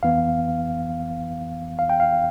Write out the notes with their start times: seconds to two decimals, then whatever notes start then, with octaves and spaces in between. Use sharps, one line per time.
0.03 F2 E3 B3 F5
1.79 F5
1.90 G5
2.00 F5